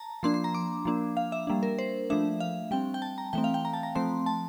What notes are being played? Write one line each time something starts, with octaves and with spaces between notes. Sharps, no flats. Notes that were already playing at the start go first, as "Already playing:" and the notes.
Already playing: A5 A#5
F3 A#3 D4 C6
C6
A#5
D6
F3 A#3 D4
F5
E5
G3 A#3 D4
A#4
C5
F3 A3 D4 E5
F5
G3 C4 G5
G5
A5
A#5
E3 A3 C4 G5
F5
G5
A#5
A5
A#5
F3 A3 C4 C6
A5